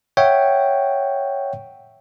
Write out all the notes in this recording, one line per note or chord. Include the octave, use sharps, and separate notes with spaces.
C#5 E5 F#5 G5